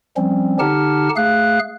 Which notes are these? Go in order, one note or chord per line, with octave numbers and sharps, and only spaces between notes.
F3 G3 C4 C#4
D3 D#4 G4 F#5 A5 F6
A3 G#4 F5 F#6